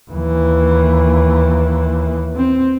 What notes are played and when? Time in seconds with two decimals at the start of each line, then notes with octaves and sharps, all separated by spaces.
0.11 D#2 E3
2.36 C4